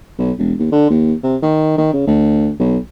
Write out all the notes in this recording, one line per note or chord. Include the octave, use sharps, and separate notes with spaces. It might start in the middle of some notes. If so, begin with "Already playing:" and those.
B1
E1
D#2
D3
D#2
C3
D#3
D#3
C#3
D2
B1